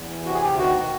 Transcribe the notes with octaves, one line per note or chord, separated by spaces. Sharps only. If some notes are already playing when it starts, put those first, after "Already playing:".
Already playing: E2
E3
C3 F#4
G#4
D2 G4
D#3 F#4
B2